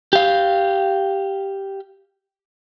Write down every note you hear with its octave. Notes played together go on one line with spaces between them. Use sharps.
G4 F5